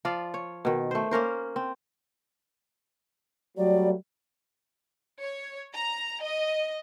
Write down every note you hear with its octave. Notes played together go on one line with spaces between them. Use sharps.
F3 F4 D5
C#5
B2 D#3
A3 C5
A#3 C#4 A#4 C5
C4
F#3 G3 A3 D5
C#5
A#5
D#5